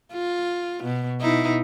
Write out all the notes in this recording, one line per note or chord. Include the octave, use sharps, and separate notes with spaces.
F4
B2
B2 D#4 E4